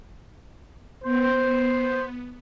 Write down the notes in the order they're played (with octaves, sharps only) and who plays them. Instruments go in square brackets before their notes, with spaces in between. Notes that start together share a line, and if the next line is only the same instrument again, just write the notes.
[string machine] B3 [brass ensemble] C5